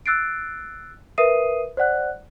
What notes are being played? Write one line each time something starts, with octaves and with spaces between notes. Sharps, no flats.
E6 F#6 A6 C7 D7
A#4 B4 E5 D#6 C7 D#7
C5 D5 F#5 F#6